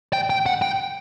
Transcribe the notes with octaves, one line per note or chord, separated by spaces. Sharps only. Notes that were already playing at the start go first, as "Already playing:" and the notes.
G5
G5
F#5
G5